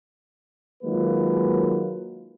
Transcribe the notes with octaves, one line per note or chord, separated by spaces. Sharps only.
D#3 F#3 G#3 A#3 F4 B4